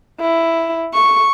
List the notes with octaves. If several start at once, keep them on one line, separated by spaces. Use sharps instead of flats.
E4
C#6